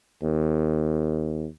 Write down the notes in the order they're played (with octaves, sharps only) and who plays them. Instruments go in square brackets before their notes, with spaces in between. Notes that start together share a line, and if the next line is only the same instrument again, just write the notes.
[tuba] D#2